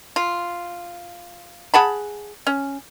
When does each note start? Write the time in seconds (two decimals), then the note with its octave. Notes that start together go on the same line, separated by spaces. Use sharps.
0.16 F4
1.74 G#4 F#5 A5 B5
2.47 C#4